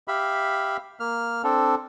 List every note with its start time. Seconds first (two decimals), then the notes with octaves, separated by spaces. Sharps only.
0.08 G4 E5 F5 B5
1.00 A#3 F6
1.44 C4 D4 A4